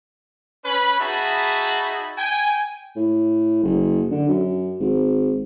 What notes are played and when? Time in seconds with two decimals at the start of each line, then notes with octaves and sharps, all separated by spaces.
0.65 C#4 B4 B5
0.99 D#4 F#4 G#4 E5 A5 B5
2.17 G5 G#5
2.96 A2
3.63 F#1
4.11 D3
4.28 F#2
4.80 G#1